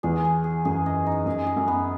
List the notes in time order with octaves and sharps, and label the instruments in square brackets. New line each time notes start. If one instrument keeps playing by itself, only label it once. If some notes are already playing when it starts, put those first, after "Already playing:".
[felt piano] E2 [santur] G#4
[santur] G#4
G#4
[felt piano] F#2 [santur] G#4
[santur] D#5
D#4
[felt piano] F#2 [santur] G#4
[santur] G#4
[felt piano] F#2
[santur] B3